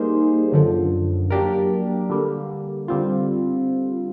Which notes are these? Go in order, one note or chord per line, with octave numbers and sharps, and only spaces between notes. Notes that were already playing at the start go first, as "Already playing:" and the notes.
Already playing: G3 A#3 D#4 G#4 C5
F#2 D3 F3
F#3 A#3 D4 G4 A#4
D3 G3 A#3
D3 G3 C4 F4